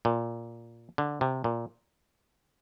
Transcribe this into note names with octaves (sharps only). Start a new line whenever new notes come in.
A#2
D3
C3
A#2